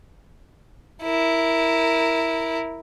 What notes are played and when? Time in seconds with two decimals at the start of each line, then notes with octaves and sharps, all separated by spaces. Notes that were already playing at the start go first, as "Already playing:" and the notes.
1.03 E4 A#4